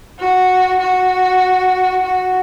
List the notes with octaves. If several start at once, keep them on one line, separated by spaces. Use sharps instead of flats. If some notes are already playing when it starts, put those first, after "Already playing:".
F#4
F#4
F#4